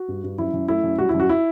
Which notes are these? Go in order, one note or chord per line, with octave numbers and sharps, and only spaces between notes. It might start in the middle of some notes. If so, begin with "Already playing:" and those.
Already playing: F#4
G2
G2
F#2 E4
F#2
A3 E4
F#2
G3 F#4
E4
F#2
F#4
E4